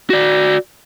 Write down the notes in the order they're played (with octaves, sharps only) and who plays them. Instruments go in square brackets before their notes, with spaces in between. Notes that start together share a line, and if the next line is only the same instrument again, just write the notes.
[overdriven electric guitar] F#4 D5